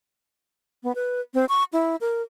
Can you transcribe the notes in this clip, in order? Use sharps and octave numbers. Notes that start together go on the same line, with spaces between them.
B3
B4
C4
C#6
E4
A#4